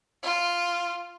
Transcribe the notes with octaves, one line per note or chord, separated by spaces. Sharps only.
F4